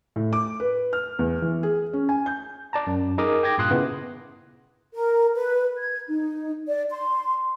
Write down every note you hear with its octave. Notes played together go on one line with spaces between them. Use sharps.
A2
D6
B4
F6
E2
E3
G#4
C#4
G#5
G6
D5 A5 A#5
F#2
D#4 G#4 A#4 A#5 D6 D#6
G5 D6 G#6 A#6
G2 A#2 F4 C6 D#6 F#6
C#3 B3 E4 B4
A#4
B4
G#6
D#4
D5
C6